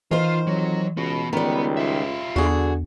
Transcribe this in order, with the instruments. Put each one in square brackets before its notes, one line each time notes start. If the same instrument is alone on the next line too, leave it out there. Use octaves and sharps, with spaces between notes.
[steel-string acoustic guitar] D#3 C5 [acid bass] E3 [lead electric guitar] F4
[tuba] F2 [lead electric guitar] F#3
[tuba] C#2 [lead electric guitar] B3 F#4
[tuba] C#2 [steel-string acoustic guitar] D#3 G3 [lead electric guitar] B3
[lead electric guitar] F4 E5
[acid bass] E2 [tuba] D3 [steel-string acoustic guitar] F#4 G#4